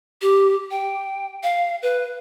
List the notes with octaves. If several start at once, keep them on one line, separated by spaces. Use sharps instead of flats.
G4
G5
F5
B4